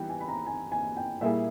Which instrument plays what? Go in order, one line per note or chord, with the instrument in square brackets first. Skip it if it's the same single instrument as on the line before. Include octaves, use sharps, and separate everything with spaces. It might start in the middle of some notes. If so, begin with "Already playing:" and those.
Already playing: [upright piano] E3 G3 B3 D#4 G4 [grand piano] G5
[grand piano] G#5
B5
A#5
G#5
G#5
G5
[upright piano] A#2 G3 A#3 E4 G#4 [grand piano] E5